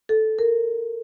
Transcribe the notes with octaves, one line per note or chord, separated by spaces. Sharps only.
A4
A#4